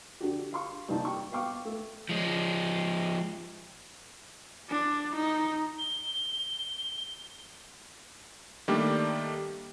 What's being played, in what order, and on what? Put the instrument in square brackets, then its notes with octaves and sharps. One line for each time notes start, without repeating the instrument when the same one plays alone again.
[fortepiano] D3 D4 F#4 G4
G4 F5 C6 C#6
G2 C3 A#3 D#4 A5
G5 C#6
B3 F5 G5 C#6 D6
A3
[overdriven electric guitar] F3 G#3
[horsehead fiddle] D4
D#4
[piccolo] G7
[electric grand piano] D#3 G3 A3 A#3 D4 G4